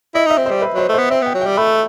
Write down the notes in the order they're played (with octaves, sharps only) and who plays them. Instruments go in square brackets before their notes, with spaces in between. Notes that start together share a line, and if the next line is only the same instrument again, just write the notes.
[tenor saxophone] E4 [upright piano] D#5
[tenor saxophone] D#4 [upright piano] E5
[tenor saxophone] C4
[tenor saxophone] G3 [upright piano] C5
[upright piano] B4
[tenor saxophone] F#3 [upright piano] C5
[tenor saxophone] A3
[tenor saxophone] B3 [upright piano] C5
[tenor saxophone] C4 [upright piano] E5
[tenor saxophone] B3 [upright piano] G5
[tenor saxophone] F#3
[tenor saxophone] G3 [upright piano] G5
[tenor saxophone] A3 [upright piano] B5